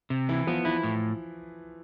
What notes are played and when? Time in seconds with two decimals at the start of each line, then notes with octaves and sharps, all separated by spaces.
0.10 C3
0.29 E3 E4
0.47 F3 B3
0.65 E3 E4
0.83 A2